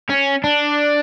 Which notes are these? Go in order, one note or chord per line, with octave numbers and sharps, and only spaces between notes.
C#4
D4